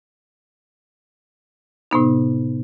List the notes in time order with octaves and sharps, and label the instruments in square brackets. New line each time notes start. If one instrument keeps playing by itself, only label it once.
[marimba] A2 C3 B3 D#4